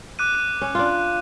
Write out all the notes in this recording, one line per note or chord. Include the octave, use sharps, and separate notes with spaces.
D6 F#6 D#7
F#6 D#7
C#4
D4 F4